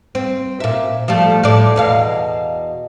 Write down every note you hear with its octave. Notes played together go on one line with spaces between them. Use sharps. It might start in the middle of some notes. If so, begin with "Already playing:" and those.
C4
A#2 E5
F3 G3 A3
A2 D5
E2 B2 F5